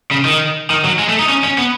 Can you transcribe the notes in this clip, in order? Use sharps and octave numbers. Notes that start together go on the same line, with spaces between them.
C#3
D#3
D#3
F#3
G#3
A3
D#4
C#4
C#4
B3